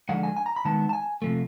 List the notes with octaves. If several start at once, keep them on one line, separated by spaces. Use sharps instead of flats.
D3 F3 G#3 F#5
G#5
G#5
A#5
B5
D#3 G#3 B3 A5
A5
G#5
C3 F3 A3